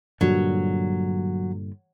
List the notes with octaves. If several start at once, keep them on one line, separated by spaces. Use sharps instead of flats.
G2 A#2 D3 F#3